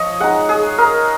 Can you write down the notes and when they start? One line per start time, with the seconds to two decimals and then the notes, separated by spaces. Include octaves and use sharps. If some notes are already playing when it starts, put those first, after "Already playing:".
Already playing: F3 C#5 D#5
0.20 G#3 D#4 F#5
0.49 G#4
0.78 A#4